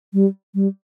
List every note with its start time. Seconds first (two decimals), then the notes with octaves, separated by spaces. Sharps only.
0.14 G3
0.55 G3